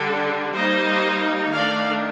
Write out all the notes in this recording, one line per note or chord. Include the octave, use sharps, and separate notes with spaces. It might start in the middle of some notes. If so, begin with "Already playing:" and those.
Already playing: D3 G3 D4 A4
G3 A#3 D#4 C5 D#5
D#3 A3 D4 D5 F5